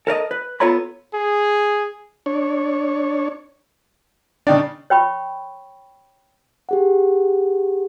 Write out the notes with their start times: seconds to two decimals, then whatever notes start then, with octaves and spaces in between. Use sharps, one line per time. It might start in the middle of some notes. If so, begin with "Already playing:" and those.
0.07 A4 A#4 D5 D#5
0.31 B4
0.60 B3 F4 A4 C#5 A#5 B5
1.14 G#4
2.26 D4 C#5
4.47 C#3 D4 D#4 D5 G5
4.90 C#5 G5 B5 C#6
6.69 G4 G#4 F#5